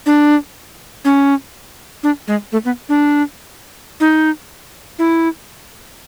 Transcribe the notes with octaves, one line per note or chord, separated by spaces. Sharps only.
D4
C#4
D4
G#3
A3
B3
D4
D#4
E4